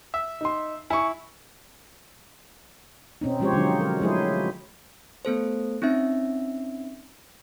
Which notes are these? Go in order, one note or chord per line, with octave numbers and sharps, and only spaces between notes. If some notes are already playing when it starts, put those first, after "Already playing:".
E5
D#4 C6
E4 G#5 C#6
B2 C4 C#4 D#4
F3 G#3 C#4 G4 C5 C#5
D3 F#3 G#3 D#4
A#4
F#3 G#3 A3 E4 G#4 C5
A3 B3 A4 C5
C4 C#4 D#4 E5